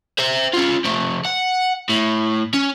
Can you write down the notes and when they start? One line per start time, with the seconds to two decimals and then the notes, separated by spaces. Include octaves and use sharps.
0.19 C5 E5
0.54 C#4 F4
0.85 F3 A3
1.25 F#5
1.89 A2
2.54 C#4